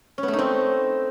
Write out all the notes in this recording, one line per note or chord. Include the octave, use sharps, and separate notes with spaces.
C#4
B3
A3
D#4
C4